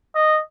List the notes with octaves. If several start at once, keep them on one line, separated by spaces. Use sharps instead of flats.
D#5